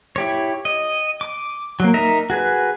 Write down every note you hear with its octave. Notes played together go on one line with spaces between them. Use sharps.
E4 G4 C#5
D#5
D6
F#3 A#3
D#4 A#4 E5 A#5
F#4 G#4 B4